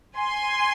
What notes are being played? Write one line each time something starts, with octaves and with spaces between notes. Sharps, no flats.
G#5 C6